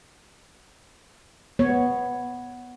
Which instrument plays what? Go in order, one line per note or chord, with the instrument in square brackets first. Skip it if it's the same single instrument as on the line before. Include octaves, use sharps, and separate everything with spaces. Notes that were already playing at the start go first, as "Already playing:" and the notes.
[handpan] B3 C#5